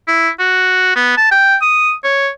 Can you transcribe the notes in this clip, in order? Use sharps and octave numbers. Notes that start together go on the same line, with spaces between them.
E4
F#4
B3
A5
G5
D#6
C#5